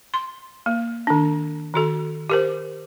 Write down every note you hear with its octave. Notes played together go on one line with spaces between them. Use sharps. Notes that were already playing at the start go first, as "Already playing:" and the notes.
C6
A#3
D#3 D4
D#3 F#4 A4
G4 A#4 C5